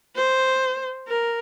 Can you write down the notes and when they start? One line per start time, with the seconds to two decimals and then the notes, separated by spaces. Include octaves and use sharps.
0.16 C5
1.08 A#4